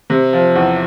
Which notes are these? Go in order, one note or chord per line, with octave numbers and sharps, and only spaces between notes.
C3
F3
E2